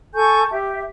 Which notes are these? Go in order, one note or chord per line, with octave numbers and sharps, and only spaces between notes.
A4 G#5 C#6 G6
G4 E5